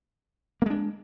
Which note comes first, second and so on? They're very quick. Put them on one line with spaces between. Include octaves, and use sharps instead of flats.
A#3 G#3 D4